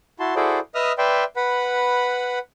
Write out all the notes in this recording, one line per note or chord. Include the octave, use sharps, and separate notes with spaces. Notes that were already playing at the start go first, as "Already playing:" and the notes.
E4 F#4 A5 C6
E4 F#4 G#4 A4 C5 D5
B4 D#5 E5 D#6 F6
B4 D5 E5 G5 C6
B4 F#5 B5